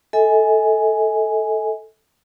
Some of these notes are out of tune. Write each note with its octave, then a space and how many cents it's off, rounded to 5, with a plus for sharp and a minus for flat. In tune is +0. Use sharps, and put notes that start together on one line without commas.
A4 +0 D#5 +45 G#5 +0